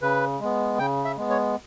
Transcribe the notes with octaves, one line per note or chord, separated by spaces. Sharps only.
C#3 B4
G#3 B3
C#3 G5
E5
G#3 B3
C#5